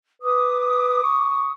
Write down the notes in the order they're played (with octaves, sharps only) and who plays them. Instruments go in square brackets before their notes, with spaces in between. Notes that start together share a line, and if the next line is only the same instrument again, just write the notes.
[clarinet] B4 [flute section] D6 D#6
[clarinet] C#6